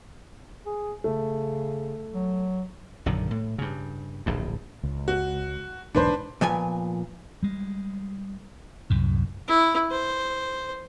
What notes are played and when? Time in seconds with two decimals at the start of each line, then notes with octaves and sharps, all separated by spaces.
0.66 G#4
1.04 C#3 A3
2.13 F#3
3.06 A#1 F#2 D3 D#3
3.31 A2
3.58 G2 C#3
4.26 D1 A#1 G2
4.83 C#2
5.08 F#4
5.95 B1 E2 G#2 D4 B4 C5
6.41 A#2 F3 B3 G#5
7.43 G3 G#3
8.90 C2 F#2 A2
9.48 E4
9.91 C5